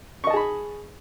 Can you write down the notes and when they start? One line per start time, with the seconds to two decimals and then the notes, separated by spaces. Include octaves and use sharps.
0.24 C#6
0.27 D#5
0.30 A5
0.33 G#4
0.36 B5